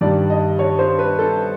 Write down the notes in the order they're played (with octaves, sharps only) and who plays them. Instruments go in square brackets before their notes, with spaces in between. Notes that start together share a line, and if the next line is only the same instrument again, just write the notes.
[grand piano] G2 D#3 G3 D5
D#5
C#5
C5
B4
A4